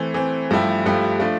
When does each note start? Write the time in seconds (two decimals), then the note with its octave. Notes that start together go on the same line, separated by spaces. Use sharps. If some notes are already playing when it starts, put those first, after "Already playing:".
Already playing: E3 A3 C4
0.14 E3 A3 C4
0.51 G2 F3 A3 E4 G4
0.86 G2 F3 A3 E4 G4
1.20 F3 A3 D4